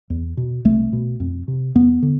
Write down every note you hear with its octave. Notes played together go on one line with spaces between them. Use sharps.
E2
B2
C2 A3
B2
F2
C3
E2 B3
D3